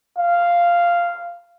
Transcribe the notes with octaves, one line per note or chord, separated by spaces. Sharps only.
F5